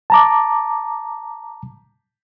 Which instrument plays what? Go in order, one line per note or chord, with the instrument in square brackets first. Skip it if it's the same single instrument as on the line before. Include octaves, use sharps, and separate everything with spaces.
[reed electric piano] A5 A#5 D6